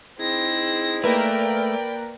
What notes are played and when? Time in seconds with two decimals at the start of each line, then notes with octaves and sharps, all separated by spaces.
0.19 C4 D#4 E4 G#4 A#6
1.04 A3 A#3 A#4 B4 D5 G5